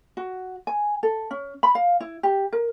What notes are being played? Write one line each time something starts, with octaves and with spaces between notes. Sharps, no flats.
F#4
G#5
A4
C#4
B5
F5
E4
G4
A#4